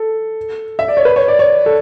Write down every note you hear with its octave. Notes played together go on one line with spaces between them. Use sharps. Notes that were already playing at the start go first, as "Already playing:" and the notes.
Already playing: A4
E5
D5
C#5
B4
C#5
D5
C#5
A4